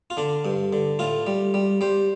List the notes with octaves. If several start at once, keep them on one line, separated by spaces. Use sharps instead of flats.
F4
D3 D4
G2
D3
A2 F4
G3
G3
G3 C5